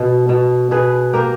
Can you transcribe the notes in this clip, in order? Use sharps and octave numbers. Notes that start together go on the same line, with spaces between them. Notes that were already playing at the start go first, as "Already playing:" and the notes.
Already playing: B2
B2
B2 G#4 B4
A#3 G4 A#4